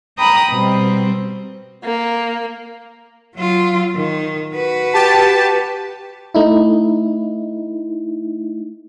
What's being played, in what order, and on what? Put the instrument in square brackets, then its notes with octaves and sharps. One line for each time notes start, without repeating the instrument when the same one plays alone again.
[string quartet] G5 A#5 B5 D#6 F#6
B2 G3 C4
[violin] A#3
[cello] F#3 F4
D#3
F#4 B4
[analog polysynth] G4 A5
[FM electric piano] A3 D#4 E4